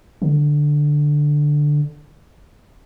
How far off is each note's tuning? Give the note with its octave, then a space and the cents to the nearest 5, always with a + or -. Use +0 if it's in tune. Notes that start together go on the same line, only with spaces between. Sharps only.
D3 +5